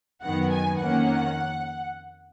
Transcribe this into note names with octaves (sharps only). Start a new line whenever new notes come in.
F#2 D#3 F#3 B3 F#5
G#5
F2 D#3 A#3 C#4 F#5